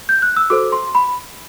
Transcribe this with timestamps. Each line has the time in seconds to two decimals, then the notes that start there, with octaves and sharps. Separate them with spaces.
0.09 G6
0.22 F#6
0.36 E6
0.50 F#4 A4 C5 D6
0.72 C6
0.95 B5